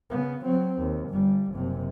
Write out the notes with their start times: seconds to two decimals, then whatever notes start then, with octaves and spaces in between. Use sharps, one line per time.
0.10 C#3 B3
0.43 F#3 C4
0.79 D#2
1.09 G1 G3
1.52 F#1 C3